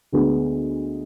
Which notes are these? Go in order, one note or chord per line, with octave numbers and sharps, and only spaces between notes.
D2 D3 G#3 B3